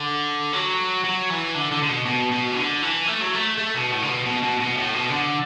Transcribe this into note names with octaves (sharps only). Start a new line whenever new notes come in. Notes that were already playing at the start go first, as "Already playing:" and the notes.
Already playing: D3
F#3
F#3
E3
D3
D3
D3
B2
B2
B2
E3
D3
E3
A3
F#3
A3
A3
B2
A2
D3
B2
B2
B2
B2
A2
B2
D3